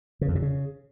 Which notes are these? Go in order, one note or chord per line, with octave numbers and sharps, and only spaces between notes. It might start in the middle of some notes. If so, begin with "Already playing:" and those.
C#3
F2
C3
C#3